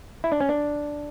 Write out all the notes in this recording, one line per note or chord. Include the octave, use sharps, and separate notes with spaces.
E4
D4
C#4
D4